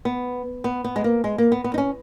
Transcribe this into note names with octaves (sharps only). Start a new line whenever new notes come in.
B3
B3
B3
G#3
A#3
G#3
A#3
B3
B3
D#4
C#4